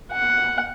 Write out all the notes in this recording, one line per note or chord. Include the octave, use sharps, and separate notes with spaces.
F#5